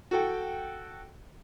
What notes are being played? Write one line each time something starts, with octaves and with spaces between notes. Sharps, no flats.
F#4 A4 G5